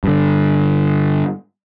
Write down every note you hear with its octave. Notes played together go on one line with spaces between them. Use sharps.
G2 D3